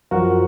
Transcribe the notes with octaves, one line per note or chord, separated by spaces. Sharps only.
F#2 F3 F#4 A#4